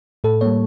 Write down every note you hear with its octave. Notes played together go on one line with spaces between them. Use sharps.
A2 A4
G3 A#3 C#5